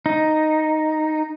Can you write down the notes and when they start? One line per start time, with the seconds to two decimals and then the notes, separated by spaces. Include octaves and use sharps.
0.06 D#4